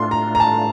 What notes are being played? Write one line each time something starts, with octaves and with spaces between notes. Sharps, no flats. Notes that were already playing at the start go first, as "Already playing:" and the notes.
Already playing: A2 A3 D4 F4 C6
A#5
A#5
A5